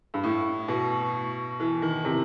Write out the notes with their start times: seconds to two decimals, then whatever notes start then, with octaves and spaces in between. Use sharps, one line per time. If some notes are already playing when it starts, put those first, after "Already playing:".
0.14 G2
0.23 A2
0.68 B2
1.60 E3
1.82 D#3
2.05 C3